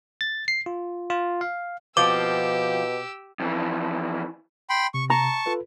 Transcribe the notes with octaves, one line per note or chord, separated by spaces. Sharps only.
A6
C7
F4
F4
F5
B2 F3 C4 G4 D6 E6
F2 E3
G5 B5 C6
C3 C#6
A5 A#5 C#6
F4 A4 B4